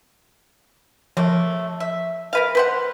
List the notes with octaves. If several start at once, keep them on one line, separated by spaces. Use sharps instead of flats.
F3 A3 A#3
E5
A#4 B4 F5
B4 C5 F#5